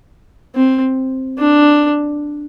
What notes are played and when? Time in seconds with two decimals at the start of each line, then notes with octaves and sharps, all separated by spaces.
0.55 C4
1.38 D4